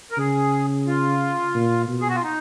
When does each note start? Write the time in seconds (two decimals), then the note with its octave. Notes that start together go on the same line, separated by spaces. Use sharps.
0.11 A#4
0.18 C#3 G#4
0.87 F4
1.55 A#2
1.88 B2
2.01 G#4
2.09 F#4
2.15 F4
2.23 D#4